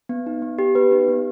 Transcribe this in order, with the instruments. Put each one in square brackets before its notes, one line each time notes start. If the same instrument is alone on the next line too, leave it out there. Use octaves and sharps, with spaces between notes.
[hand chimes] B3
D#4
B3
G4
B3 B4
D#4
B3